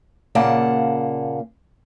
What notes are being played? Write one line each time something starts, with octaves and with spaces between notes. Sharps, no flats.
A#2 C#3 A#3 F5 F#5 A5